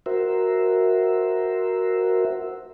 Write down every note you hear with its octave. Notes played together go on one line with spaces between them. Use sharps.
F#4 A#4 C5 E5